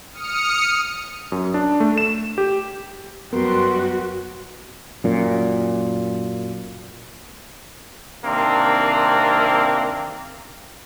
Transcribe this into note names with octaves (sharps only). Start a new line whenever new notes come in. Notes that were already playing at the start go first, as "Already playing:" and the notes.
D#6 F6 C#7
F#2
D4
A3
E7
G4
F#2 G3 B3 F#4 A#4 C6
F#2 A#2
C3 D#3 A#3 C4 D4